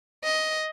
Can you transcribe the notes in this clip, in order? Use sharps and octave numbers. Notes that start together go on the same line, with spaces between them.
D#5